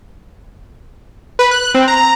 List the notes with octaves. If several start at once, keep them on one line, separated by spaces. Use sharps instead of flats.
B4
F#6
C4
A#5